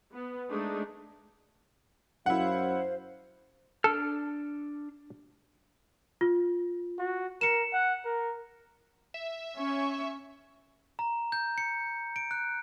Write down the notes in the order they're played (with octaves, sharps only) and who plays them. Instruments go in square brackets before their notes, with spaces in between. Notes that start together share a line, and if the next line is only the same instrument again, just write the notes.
[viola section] B3
G#3 A3 D4 D#4
[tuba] F#2 [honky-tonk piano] E4 F#5 [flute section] C5 F5
[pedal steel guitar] D4 F6 [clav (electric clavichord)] A4
[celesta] F4
[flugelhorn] F#4
[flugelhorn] A#4 [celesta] C#7 E7
[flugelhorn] F#5
A#4
[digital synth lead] E5
[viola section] C#4 [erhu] C#6
[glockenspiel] A#5
G6
C#7
D7
F#6